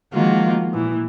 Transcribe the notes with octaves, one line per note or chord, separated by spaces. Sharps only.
D#3 F3 G#3 A#3 F4 F#4
A#2 E3